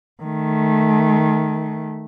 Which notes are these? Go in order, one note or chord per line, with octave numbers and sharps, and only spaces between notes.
D#3 A3